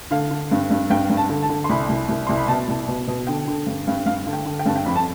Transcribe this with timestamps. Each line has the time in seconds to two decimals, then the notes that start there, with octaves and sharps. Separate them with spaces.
0.11 D3 F5
0.31 D3
0.51 G2
0.70 G2
0.90 G2 G5
1.10 G2
1.17 A5
1.29 D3
1.42 A5
1.50 D3
1.64 C6
1.69 C2 B5
1.89 C2
2.09 C2
2.27 C2 C6
2.37 B5
2.48 B2 A5
2.68 C2
2.88 B2
3.08 B2
3.27 D3 G5
3.48 D3
3.67 G2
3.87 G2
4.06 G2 F5
4.27 D3
4.33 G5
4.45 D3
4.59 G5
4.66 G2 A5
4.76 G5
4.86 F2 B5
4.96 A5